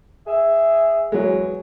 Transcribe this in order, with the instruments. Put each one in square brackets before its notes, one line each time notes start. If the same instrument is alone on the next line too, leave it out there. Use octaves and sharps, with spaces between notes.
[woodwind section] G#4 E5
[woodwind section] E2 [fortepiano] F#3 G#3